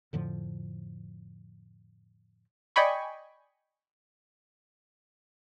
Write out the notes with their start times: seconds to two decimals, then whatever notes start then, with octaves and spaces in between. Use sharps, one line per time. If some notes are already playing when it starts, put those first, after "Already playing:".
0.13 F2 A2 D3 F3
2.76 D5 D#5 G5 G#5 B5 C#6